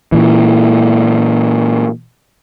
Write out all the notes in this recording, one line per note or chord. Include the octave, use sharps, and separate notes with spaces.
A#2 E3